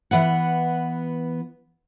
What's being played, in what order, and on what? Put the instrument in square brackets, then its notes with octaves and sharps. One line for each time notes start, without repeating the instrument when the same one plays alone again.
[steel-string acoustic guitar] E3 B3 F#5